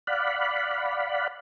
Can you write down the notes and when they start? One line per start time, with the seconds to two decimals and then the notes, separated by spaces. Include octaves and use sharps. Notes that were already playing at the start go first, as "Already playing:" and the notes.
0.07 D5 F5 F#5 B5